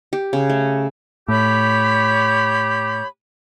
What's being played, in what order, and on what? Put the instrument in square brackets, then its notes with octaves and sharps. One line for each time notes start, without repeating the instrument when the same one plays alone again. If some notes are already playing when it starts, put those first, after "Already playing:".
[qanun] G4
C#3
A3
[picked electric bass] A2 [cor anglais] G4 [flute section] C#5 B5 G6